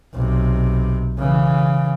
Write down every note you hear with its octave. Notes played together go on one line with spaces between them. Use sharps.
B1 C3
C#3 E3